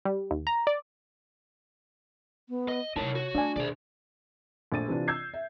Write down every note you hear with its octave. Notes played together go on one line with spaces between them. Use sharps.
G3
D#2
A#5
D5
B3
D#5
C3 D#4 E4 A#4 C#5 A5
F#4
A3 D4 G#5
D#2 B2 G#4 C5 D5
A#1 A3 A6 D#7
C3 E3 D4 F4
E6 G6 G#6 C7
E5